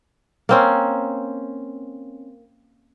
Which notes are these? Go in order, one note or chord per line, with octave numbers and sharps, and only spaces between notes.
A#3 C4 C#4